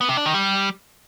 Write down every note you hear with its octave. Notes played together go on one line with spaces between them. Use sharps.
B3
C3
D4
D#3
G3